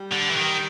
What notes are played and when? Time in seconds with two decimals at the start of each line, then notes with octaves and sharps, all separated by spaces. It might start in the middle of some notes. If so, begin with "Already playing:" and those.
Already playing: G3
0.13 D3
0.31 E3
0.37 D#3